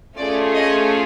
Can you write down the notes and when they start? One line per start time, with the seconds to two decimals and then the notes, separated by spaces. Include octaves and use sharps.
0.17 A3 C#4 F4 G#4 D5
0.55 D#5